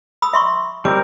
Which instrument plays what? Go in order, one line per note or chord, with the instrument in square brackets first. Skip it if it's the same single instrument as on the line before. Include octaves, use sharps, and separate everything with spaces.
[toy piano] B5 D#6 E6
E5 C6 C#6
[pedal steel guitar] G3 C4 A#4 [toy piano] D6